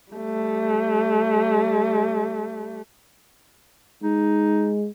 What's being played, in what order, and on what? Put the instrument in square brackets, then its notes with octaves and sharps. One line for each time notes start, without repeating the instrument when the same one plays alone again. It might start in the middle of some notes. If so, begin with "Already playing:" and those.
[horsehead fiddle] G3 A3
[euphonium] G#3 [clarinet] D#4